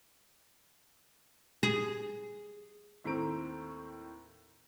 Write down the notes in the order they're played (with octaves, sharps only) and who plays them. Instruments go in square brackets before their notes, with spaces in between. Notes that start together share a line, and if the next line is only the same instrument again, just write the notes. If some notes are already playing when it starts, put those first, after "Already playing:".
[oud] G#4
[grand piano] D#2 A2 C4 A#5 D7